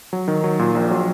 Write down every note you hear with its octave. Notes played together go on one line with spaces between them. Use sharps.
F#3
D#3
F#3
A#2
A#1
F#3